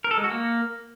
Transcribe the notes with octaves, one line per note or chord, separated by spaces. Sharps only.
A#4
A4
G#3
F#4
A#3